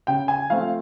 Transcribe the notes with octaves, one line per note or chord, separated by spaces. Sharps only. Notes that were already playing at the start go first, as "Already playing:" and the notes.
C#3 G5
G#5
F3 A3 C4 F5